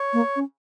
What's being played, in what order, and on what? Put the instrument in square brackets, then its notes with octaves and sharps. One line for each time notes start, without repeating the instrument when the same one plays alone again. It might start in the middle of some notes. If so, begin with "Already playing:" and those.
Already playing: [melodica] C#5
[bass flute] A#3
C#4